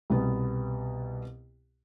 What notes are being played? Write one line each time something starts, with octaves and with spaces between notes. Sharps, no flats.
C2 B2 B3